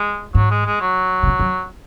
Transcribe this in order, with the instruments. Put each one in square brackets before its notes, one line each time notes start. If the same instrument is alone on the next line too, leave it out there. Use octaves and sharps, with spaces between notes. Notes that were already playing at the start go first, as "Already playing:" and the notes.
Already playing: [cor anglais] G#3
[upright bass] G#2 [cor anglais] F#3
[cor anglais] G#3
G#3
F#3
[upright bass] C3
A2
F#2